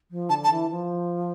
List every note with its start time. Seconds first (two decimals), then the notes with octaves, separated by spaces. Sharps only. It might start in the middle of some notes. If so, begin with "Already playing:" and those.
0.11 F3
0.29 D3 A5
0.44 A5
0.50 E3
0.70 F3